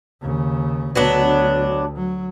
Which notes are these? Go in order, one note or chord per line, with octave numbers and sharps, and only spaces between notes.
D#2 C#3
D2 F#3 B3 D4
F#3